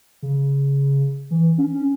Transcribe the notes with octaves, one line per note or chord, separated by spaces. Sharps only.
C#3
E3
C#4
C#4